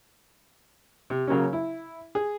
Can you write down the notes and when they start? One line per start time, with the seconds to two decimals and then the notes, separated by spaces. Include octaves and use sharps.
1.10 C3
1.27 C#3 F#3 A#3 C#4
1.53 E4
2.15 G#4